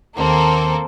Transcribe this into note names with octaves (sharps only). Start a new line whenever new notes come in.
D#2 A#3 C4 A4